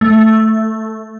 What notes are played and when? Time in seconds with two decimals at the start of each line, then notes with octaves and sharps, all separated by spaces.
0.01 A3